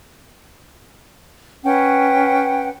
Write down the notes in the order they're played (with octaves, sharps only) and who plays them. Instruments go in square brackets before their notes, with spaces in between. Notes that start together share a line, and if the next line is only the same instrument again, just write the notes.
[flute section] C#4 B4 F#5 G5